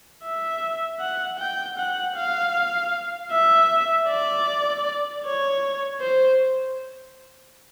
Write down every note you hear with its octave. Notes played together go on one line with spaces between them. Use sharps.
E5
F#5
G5
F#5
F5
E5
D5
C#5
C5